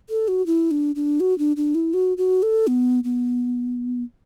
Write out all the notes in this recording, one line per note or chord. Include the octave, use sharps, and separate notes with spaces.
A4
F#4
E4
D4
D4
F#4
D4
D4
E4
F#4
F#4
A4
B3
B3